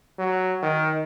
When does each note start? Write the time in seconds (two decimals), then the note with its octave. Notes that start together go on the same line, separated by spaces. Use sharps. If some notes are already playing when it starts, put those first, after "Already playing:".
0.19 F#3
0.62 D#3